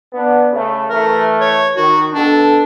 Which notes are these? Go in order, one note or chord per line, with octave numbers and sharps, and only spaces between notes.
B3 D4
C#3 A3
E3 A3 A#4
C#5
D#3 F#4
B2 D4 A4